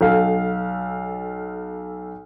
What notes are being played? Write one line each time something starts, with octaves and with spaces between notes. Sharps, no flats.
B1 A4 F5